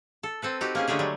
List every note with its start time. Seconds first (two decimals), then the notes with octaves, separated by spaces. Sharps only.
0.23 A4
0.42 C4 A4 B4
0.61 D#4 F#4 G4
0.75 A#3 C#4 G#4
0.88 D3 G#3 A3 G4 G#4
0.99 F#3 G3